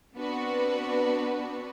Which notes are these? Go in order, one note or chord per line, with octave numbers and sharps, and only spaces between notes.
B3 C4 D4 F#4 B4